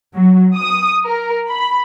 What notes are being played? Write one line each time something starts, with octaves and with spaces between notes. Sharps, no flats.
F#3
D#6
A#4
B5